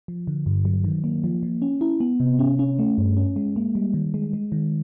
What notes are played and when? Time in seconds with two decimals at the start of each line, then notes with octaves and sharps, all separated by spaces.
0.08 F3
0.27 D3
0.46 G2
0.65 F#3
0.84 D#3
1.04 A#3
1.24 F3
1.43 F3
1.62 C#4
1.81 E4
2.00 B3
2.20 C3
2.39 C#4
2.59 C#4
2.79 A3
2.98 G2
3.17 C#4
3.36 G#3
3.56 A#3
3.75 G3
3.94 D#3
4.14 G#3
4.33 G#3
4.52 D#3